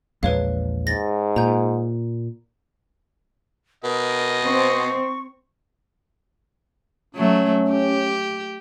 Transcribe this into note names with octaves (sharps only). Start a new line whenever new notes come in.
A#1 E2 G#3 B4 C#5 F5
G#2 A6 A#6
A#2 A#5 G6
B2 A#4 D#5
C4 C#6
F#3 A3 C#4
G4